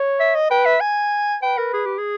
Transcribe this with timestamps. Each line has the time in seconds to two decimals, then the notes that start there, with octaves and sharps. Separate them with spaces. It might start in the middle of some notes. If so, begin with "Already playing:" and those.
Already playing: C#5
0.20 E5
0.35 D#5
0.50 B4 G5
0.66 E5
0.81 G#5
1.42 B4 G5
1.58 A#4
1.74 G#4
1.86 G4
1.98 G#4